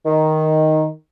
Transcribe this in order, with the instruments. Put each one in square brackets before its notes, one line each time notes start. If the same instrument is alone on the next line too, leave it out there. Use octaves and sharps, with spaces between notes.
[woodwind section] D#3